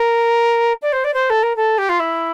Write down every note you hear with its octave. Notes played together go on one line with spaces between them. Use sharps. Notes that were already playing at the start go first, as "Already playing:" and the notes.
Already playing: A#4
D5
C5
D5
C5
A4
A#4
A4
G4
F4
E4